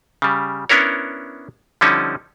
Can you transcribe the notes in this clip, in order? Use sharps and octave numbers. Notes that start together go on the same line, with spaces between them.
C#3 G3
B3 C#4 D4 E4 A#4 C#5
D3 F3 G3 C#4 D#4 E4